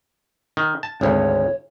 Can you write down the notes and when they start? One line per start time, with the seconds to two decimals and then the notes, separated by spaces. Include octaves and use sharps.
0.57 D#3
0.83 A5
1.01 G#1 D2 C#5